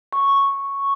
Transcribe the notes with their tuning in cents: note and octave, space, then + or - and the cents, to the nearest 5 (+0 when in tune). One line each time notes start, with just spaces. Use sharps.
C#6 -5